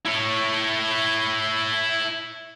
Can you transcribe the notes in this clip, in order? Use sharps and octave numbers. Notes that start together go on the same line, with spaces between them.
E4 C#5